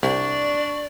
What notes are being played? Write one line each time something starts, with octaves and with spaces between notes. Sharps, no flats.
C2 D4 D5 C#6